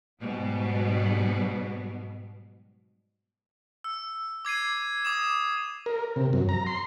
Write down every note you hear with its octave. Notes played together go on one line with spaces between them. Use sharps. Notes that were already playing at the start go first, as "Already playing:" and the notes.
G#2 B2 F#3 G3 B3
E6
D6 G#6 C7 D#7
D6 D#6 E7
A#4
C3
F#2
A#5
C6